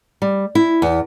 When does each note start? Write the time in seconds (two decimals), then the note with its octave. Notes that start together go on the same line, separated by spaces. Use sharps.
0.22 G3
0.55 E4
0.82 E2